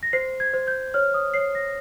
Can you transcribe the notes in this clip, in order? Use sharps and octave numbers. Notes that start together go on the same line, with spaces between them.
A#6
C5 C7
G#6
C5
G6
C#5 F6
D#6
C#5 C7
A#6